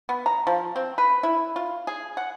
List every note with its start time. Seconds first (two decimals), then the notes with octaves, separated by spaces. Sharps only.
0.09 B3
0.26 A#5
0.47 F3
0.76 C4
0.98 B4
1.23 E4
1.56 F4
1.87 G#4
2.17 F#5